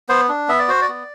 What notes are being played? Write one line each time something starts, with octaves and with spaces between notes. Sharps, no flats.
B3 C5
D4
B3 E5
D5
F#4 C5
D5
B3